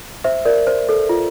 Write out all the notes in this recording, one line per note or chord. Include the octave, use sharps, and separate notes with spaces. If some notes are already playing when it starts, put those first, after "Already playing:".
C5 E5
A#4 D5
C5
A4
F4